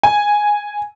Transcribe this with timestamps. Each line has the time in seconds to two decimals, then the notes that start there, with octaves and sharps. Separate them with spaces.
0.03 G#5